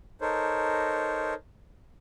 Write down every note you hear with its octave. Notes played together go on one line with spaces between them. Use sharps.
D#4 A4 A#4 C5 C#5